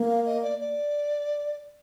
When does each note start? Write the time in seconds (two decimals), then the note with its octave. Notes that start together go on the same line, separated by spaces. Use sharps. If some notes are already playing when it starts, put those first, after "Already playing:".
Already playing: A#3
0.08 F5
0.26 D#5
0.43 D5
0.60 D5